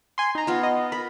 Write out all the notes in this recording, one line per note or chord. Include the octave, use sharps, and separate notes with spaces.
G#5 C6
D#4 A#5
B3 F4
D#5
A#4 B5